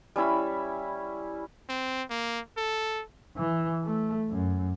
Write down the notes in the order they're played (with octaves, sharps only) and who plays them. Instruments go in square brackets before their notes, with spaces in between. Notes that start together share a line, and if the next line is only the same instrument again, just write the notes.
[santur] G3 C#4 E4 B5
[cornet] C4
A#3
A4
[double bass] E3
A3
F#2